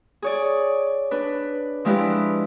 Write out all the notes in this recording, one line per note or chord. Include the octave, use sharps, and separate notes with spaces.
G#4 C#5 D5
D4 B4
F3 G#3 D4 E4 G4 B4